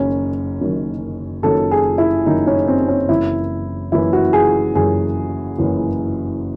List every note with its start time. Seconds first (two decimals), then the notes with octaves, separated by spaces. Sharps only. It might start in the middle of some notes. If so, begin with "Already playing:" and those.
Already playing: F#1 F#2 D#3 F#3 C#4
0.61 F#1 F#2 D#3 F#3
1.43 F#1 F#2 D#3 F#3 A4
1.71 G#4
1.98 E4
2.26 F#1 F#2 D#3 F#3 D#4
2.47 C#4
2.67 C4
2.88 C#4
3.09 F#1 F#2 E3 E4
3.92 F#1 F#2 E3 E4
4.13 F#4
4.33 G#4
4.75 F#1 F#2 E3 G#4
5.58 F#1 F#2 E3